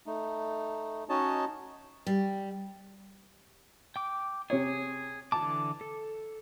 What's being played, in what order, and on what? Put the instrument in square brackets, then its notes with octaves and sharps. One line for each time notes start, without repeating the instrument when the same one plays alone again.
[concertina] A3 D#4
C#4 D#4 F#4 C#5 D#5 A5
[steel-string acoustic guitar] G3
[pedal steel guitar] G5 D6
[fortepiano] C3 C#5 [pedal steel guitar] G#4
[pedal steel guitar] D3 E3 D6 [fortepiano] A5
[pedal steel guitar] A4